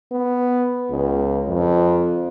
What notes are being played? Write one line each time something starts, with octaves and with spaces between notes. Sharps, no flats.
B3
C#2
F2